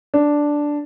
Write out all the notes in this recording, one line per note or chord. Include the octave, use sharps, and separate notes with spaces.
D4